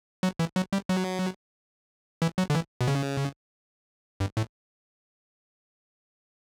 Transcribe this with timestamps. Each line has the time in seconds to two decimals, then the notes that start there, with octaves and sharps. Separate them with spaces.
0.23 F#3
0.39 E3
0.56 F#3
0.73 G3
0.89 F#3
2.22 E3
2.38 F#3
2.50 D3
2.55 E3
2.81 B2
2.88 C#3
4.20 G2
4.37 A2